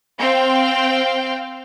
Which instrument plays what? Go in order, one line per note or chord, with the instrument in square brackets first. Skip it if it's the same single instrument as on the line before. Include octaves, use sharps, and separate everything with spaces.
[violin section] C4 F5 G5